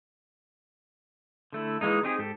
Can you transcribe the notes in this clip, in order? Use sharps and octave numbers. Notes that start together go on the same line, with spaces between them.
D3 A3 E4
E3 G#3 A#3 D#4
C4 D#4 G4 G#4
G#2 G4 A4